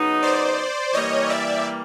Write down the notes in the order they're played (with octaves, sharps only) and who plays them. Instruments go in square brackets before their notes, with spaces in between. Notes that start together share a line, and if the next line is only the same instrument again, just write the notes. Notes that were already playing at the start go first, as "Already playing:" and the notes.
Already playing: [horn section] C#3 F#3 B3 D#4
[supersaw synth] C5 D5
[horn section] E3 G3 A#3 [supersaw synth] C#5 D#5
[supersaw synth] D5 E5